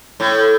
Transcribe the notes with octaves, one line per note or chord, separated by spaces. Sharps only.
A2